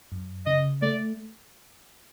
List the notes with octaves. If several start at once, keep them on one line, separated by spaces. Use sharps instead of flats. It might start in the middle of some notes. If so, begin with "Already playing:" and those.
F#2
C#3 D#5
A3 D5